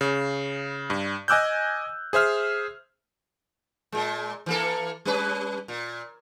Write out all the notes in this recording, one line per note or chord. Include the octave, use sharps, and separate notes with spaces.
C#3
G2
D#5 G#5 D6 E6 F#6 G6
G#4 C5 E5 F6
A#2 G#3
E3 A#3 A4
G3 C#4 B4
A#2